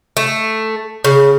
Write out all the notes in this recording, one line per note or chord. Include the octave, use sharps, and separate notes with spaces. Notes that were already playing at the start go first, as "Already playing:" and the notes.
A3
C#3